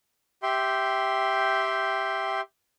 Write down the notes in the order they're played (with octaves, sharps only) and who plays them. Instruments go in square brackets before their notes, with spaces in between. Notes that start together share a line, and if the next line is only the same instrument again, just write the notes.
[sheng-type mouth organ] G4 E5 G5 C6